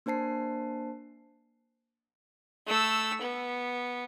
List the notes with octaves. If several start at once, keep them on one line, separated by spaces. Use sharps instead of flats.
A#3 D4 C5 A5 C7
A3 E6
B3